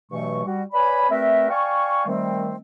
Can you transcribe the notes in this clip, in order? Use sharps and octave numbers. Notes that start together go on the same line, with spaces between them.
G2 B2 E3 F#3 A3 C#6
G3 F#4
B4 C#5 D5 G#5 B5
G3 A3 C4 A#4 B4 E5
D5 F5 G5 G#5 C#6
D#3 G3 A3 C4